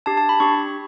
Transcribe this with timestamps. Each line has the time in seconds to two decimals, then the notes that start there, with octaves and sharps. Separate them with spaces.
0.06 D4 G4 A5
0.17 A5
0.29 B5
0.40 D4 G4 C#6